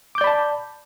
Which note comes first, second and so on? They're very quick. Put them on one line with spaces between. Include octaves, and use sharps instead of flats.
D6 G6 D5 B5 A5